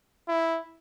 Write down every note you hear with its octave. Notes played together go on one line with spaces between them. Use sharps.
E4